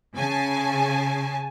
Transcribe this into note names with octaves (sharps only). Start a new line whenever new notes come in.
C#3 G#5 A5